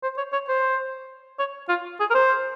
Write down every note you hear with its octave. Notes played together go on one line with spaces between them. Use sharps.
C5
C#5
C#5
C5
C#5
F4
G#4
A#4
C5